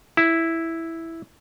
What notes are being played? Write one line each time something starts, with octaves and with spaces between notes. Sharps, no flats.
E4